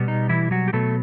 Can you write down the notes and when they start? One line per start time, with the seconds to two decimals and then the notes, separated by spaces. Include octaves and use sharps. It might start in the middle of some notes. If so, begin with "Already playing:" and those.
Already playing: B2 G3 B3
0.08 D#4
0.29 E3 E4
0.51 F#3 F#4
0.68 G4
0.73 B2 F#3 A3 B3 A4